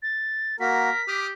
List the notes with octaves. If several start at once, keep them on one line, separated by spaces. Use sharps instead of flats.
A6
A#3 F#4 A#4 B6
G4 D6 D#6 F6